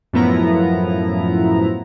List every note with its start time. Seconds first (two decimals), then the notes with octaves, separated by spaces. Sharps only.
0.13 F#2 A2 F3 B3 E4 A#5